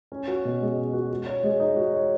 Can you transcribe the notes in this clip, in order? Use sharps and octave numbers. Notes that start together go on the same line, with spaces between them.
C#4
F#4
B2
G#3
C#4
F#4
F#4
C#5
G#3
D#4
F#4
C#5